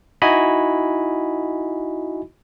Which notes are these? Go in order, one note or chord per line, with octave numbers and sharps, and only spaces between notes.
D#4 E4 F#4 D#5 G#5 B5